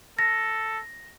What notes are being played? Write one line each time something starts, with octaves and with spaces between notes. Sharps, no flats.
A4 A#6